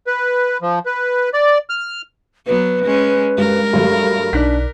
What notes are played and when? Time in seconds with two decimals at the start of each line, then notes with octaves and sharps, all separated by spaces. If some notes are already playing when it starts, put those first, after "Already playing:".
0.07 B4
0.62 F3
0.86 B4
1.34 D5
1.70 F6
2.47 F#3 B3 B4
2.85 G#3 C#4
3.38 G2 G#3 A#4
3.73 G2 F#3 A3
4.33 B1 D4 D#4 D5 F#6 B6